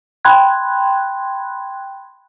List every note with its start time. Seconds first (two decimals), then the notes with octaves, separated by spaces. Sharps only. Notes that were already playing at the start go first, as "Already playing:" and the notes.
0.25 G5 B5 C6 F#6 G#6